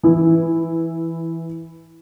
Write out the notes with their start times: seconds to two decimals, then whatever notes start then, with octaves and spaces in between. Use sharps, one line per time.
0.03 E3 E4